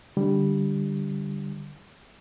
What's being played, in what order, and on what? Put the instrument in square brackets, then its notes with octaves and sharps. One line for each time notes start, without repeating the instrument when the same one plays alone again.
[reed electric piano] D3 G3